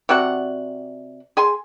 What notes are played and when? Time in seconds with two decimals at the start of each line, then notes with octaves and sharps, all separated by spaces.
0.09 C3 F#4 D5 F#5
1.37 G#4 G#5 C6